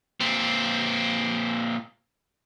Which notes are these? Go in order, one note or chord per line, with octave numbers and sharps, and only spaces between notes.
A#2 C4